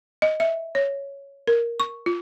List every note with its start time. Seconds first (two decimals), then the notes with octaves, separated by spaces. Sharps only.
0.22 D#5
0.40 E5
0.75 C#5
1.48 A#4
1.80 C#6
2.06 F4